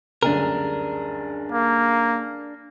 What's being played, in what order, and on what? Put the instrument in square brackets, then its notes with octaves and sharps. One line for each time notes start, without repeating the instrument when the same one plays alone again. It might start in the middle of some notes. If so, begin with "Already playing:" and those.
[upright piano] F#1 D2 G2 [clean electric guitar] D4 G#4 A#4
[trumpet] A#3